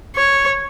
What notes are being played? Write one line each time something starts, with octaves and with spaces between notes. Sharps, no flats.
C#5